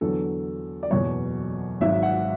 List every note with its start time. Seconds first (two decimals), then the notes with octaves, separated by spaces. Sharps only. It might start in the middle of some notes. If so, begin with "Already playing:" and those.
0.01 E2 D3 F#3 A4
0.83 D5
0.90 F#1 E2 B2 F#3 C#5
1.81 G#1 G#2 F#3 E5
2.03 F#5